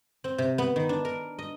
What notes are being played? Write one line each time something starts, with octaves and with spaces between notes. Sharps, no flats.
C4
C3
B3
D#3
D4
A#4
D#5